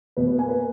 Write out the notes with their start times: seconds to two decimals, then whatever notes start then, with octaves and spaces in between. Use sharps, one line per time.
0.17 B2 B4
0.28 B4
0.38 A#3 G#5
0.49 B4